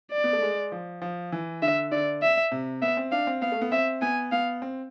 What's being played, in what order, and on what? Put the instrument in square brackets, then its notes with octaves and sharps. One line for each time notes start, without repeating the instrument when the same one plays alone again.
[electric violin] D5
[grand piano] B3
A3
G#3
F3
F3
E3
[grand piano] D3 [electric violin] E5
[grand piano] D3 [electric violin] D5
[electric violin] E5
[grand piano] C3
[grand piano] B3 [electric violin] E5
[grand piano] C4
[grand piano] D4 [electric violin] F5
[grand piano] C4
[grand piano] B3 [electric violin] F5
[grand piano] A3
B3
[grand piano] C4 [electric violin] E5
[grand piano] B3 [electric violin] G#5
[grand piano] B3 [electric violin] F5
[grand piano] C4